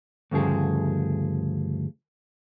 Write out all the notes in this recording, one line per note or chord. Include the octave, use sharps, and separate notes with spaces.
D2 G2 C#3 F3 G#4